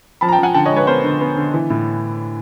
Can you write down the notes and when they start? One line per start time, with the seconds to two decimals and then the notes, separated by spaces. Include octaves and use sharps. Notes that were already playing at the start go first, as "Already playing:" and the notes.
0.21 F3 A5 B5
0.28 A#5
0.32 G5 A5
0.39 F3 F#5 G#5
0.54 D3 G5 A5
0.65 C#5 D#5
0.72 G#3
0.77 B4 C#5
0.87 B3 A#4 C5
1.04 D3
1.21 B3
1.37 D3
1.54 E3
1.70 A2